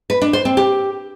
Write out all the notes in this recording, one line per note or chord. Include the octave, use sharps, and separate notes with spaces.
B4
D4
C5
C4
G4